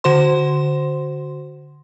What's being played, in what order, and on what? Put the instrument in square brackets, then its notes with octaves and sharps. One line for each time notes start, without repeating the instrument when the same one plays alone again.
[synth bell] D3 F#4 C5 C6